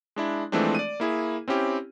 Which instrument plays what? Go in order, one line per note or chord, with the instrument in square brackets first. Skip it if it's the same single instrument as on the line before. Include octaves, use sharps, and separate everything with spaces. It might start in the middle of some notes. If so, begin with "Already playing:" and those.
[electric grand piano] G#3 D4 E4
E3 F3 G#3 A3 C4 D4
D5 D#7
A#3 E4 G#4
C4 C#4 E4 G4